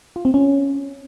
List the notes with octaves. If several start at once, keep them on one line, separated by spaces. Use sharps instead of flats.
F4
C4
C#4